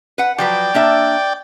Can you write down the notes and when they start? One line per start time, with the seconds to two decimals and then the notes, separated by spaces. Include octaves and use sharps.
0.18 B4 F#5
0.38 F3 F#3 B4 D5 G5
0.74 A#3 D4 E5